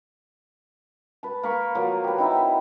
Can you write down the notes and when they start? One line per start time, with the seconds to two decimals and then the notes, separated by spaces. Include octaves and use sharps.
1.23 B4 A5
1.43 A#3 B5 C#6
1.75 F3 F#3 A#3
2.04 G4 B4
2.18 C4 D#4 E4
2.31 G#5